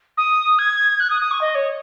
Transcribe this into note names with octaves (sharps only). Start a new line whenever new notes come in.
D#6
G#6
F#6
D#6
D#6
C#6
D#5
C#5